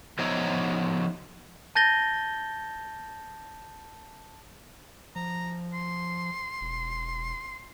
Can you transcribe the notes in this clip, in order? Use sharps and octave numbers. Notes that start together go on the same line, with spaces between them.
F3 B3 D#4 C#5 D#5 E5
A5 G6 A6 A#6 G7
F3 A#5
C6
E1